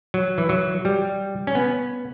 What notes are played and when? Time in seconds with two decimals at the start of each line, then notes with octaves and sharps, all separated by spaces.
0.14 F#3
0.38 E3
0.49 F#3
0.85 G3
1.47 C#4
1.55 B3